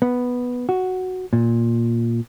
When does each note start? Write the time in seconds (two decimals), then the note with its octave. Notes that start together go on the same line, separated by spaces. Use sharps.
0.02 B3
0.69 F#4
1.33 A#2